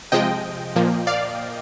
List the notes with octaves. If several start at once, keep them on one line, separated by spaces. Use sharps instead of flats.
C3 F3 G#3 D#5 G5
A#2 F3 A#3
D5 F5